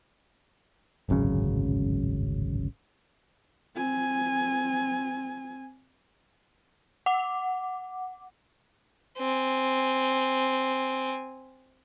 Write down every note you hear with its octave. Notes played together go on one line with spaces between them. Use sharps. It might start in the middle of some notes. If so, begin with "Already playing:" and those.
D1 G#1 F#2 C#3
C4 G#5
F#5 D6
C4 G#5